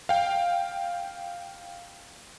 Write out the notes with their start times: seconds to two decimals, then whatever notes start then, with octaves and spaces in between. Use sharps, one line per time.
0.09 F5 G5